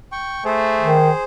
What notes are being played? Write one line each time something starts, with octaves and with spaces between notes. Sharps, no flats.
G5 C#6
A3 G#4 C5
D#3